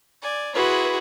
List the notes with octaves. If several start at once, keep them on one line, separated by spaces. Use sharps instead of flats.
D5 G#5
E4 F#4 G#4 B4 C6